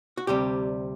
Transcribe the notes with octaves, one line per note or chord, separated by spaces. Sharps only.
F#4
D2 C3 G3 G4